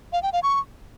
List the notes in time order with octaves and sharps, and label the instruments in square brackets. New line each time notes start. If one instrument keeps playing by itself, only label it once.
[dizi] F5
G5
F5
C#6